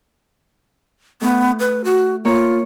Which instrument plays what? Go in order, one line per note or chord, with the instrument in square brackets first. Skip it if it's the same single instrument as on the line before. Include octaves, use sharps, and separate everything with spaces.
[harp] A3 E4 [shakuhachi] B3
[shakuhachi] B4
F#4
[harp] A#3 C#5 [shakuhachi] F4